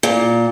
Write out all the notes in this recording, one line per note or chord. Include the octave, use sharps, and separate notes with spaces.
A#2